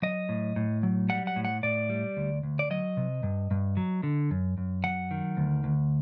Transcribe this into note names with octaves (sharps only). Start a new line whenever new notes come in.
F#3 D#5
A2
A2
F#3
G3 F#5
F#5
A2
F#5
A2 D5
G3
D2
D2
D5
F#3 D#5
C3
G2
G2
F#3
D3
F#2
F#2
F#3 F#5
D#3
D2
D2